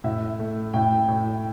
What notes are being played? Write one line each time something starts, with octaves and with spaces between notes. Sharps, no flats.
A2 E5
A3
A2 G5
A2